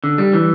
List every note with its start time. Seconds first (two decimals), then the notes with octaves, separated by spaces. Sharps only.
0.04 D3
0.18 G3
0.33 E3